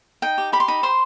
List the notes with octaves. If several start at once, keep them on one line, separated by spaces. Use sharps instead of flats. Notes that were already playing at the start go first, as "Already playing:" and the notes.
D#4 G5
G4
G4 B5
C6
D#4 B5
C5 C6